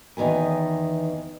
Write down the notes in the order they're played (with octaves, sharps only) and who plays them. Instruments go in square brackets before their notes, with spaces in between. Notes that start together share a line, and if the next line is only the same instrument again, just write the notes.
[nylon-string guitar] E2 D#3 B3 G#5